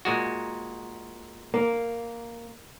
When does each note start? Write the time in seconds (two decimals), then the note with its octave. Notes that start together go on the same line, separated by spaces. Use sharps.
0.05 A#2 G#3 F#4
1.54 A#3